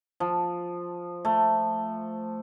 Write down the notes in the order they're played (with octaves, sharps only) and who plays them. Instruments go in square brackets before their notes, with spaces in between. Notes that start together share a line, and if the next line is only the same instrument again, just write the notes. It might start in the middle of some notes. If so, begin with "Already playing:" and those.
[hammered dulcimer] F3
A3